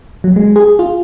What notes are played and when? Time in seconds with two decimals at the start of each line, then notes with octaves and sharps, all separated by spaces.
0.24 F#3
0.36 G#3
0.56 G#4
0.79 F4